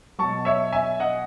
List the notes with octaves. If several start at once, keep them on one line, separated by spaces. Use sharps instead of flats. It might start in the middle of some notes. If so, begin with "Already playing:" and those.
B2 F#3 A5 C#6
C#5 E5
E5 G#5
D#5 F#5